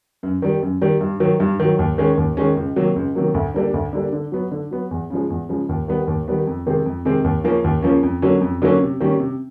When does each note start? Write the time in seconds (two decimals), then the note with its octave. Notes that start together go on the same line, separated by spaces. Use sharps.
0.23 F#2
0.42 D#3 G3
0.62 F#2
0.82 D#3 G3
1.01 G2
1.20 D#3 F#3
1.40 G2
1.60 D#3 F#3
1.79 D#2
1.98 D#3 G#3 C#4
2.17 D#2
2.37 D#3 G#3 C#4
2.57 C#2
2.76 C3 D#3 F#3 A#3
2.96 C#2
3.15 C3 D#3 F#3 A#3
3.34 D2
3.54 D3 G3 A#3 D4
3.74 D2
3.93 D3 G3 A#3 D4
4.13 D3
4.32 F#3 B3
4.51 D3
4.71 F#3 B3
4.91 E2
5.10 C#3 F3 G#3
5.30 E2
5.49 C#3 F3 G#3
5.69 D#2
5.88 D#3 G3 B3
6.07 D#2
6.28 D#3 G3 B3
6.47 F2
6.67 C3 D#3 G#3 C4
6.86 F2
7.05 C3 D#3 G#3 C4
7.24 D#2
7.44 C#3 F3 A#3 C#4
7.64 D#2
7.83 C#3 F3 A#3 C#4
8.03 F2
8.22 D3 F#3 A#3 C#4
8.41 F2
8.62 D3 F#3 A#3 C#4
8.81 C3
9.00 D#3 G3 A#3 C#4
9.20 C3